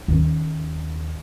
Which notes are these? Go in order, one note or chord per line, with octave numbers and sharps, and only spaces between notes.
D#2 C#4